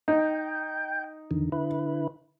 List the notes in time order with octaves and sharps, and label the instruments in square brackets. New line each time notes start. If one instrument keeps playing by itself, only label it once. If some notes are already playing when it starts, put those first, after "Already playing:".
[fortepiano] D#4 [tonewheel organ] G5
[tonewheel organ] E2 D3 D#3
D3 E4 B4